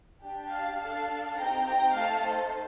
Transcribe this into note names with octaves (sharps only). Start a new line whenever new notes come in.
D4 G4
F5 A5
D4 A4 F5 A5
C4 D#4 G4 G5 A#5
G5 A#5
A3 D#4 A4 F5 A5
C5